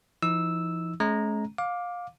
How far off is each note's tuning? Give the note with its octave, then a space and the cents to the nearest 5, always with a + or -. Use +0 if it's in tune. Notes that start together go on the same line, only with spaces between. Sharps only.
F3 -40 D#4 +35 E6 -5
G#3 +45 C#4 +0 A#5 +0
F5 +20 D6 +0